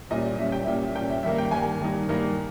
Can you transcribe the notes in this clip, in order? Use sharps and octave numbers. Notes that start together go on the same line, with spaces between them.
A#2 G3 C#4 D#5
A#2 G3 C#4 E5
G5
A#2 G3 C#4 E5
A#2 G3 C#4 G5
E5
G2 D#3 A#3 E5
G5
G2 D#3 A#3 G#5
G2 D#3 A#3 D#4
G2 D#3 A#3 D#4